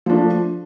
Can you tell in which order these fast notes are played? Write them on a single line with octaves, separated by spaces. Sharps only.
F3 D4 A3